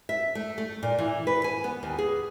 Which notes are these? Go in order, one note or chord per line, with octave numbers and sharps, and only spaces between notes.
E5
A3
A3
A#2
E3
B4
G#5
B3
D#2
G#4